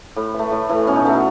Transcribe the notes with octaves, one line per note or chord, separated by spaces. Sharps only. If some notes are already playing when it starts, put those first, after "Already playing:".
A2
E3 A3
A2
E3 A3
B2 C#4
D#4
F#3 A3 E4
F#4